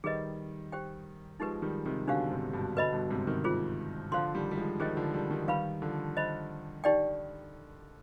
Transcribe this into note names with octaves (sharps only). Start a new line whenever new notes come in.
D#3 G3 G#4 B4 D#5
G4 C5 G5
F3 G#3 D#4 G4 B4
D#3 G3
C3 D#3
B2 D3 D4 G4 C5 F5
G#2 C3
G2 B2
B2 D3 B4 D#5 B5
G2 B2
G#2 C3
C3 D#3
F4 G#4 C5
D3 F3 C5 F5 C6
D#3 G3
G3
F3 G#3
D#3 G3 G#4 C5 D#5 G5
D3 F3
D#3 G3
D#3 G3
F3
D#3 G3 B4 F5 B5
D3 F3
C5 D#5 B5
D#4 G4 D5 G5